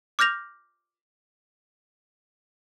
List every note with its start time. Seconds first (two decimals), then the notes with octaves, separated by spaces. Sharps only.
0.19 D6 F6 G6 A#6 F7